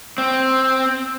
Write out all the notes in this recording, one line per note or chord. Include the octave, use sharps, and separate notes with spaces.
C4